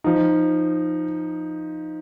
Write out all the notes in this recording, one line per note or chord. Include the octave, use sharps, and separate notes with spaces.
F3 D#4